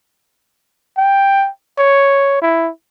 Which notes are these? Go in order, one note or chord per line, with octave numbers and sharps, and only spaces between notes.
G5
C#5
E4